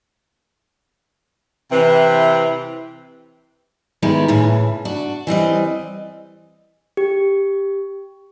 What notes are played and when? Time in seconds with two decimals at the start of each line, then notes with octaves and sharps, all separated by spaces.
1.72 C3 E3
4.02 D#3 G3 G#3 B3 E4 G#4
4.28 A2 C#3 E3
4.85 D4 F#4
5.27 E3 G3 C4 D#5
6.97 G4